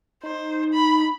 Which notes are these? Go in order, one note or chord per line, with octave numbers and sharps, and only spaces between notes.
D#4 C5
B5